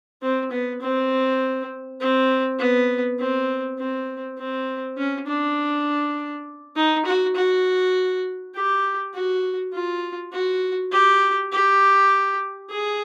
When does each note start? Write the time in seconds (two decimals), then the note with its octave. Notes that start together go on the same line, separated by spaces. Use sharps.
0.22 C4
0.52 B3
0.81 C4
2.01 C4
2.59 B3
3.19 C4
3.79 C4
4.38 C4
4.97 C#4
5.27 D4
6.76 D#4
7.06 F#4
7.36 F#4
8.55 G4
9.14 F#4
9.73 F4
10.32 F#4
10.92 G4
11.52 G4
12.70 G#4